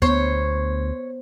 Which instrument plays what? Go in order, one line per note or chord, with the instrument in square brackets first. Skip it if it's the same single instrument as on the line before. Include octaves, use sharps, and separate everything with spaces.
[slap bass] D2 [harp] B3 [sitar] C5 [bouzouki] C#5